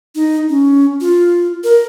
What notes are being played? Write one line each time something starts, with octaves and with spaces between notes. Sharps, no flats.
D#4
C#4
F4
A#4